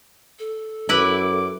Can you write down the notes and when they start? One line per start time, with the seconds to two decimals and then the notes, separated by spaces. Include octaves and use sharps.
0.39 A4
0.89 F#2 E4 B4 D6